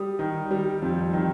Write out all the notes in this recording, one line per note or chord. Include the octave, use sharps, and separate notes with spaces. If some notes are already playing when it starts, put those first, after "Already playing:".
Already playing: G3 D#6
D#3
G3
F2
D#3